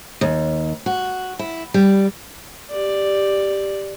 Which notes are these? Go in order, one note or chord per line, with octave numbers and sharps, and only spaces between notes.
D#2
F#4
E4
G3
G4 D5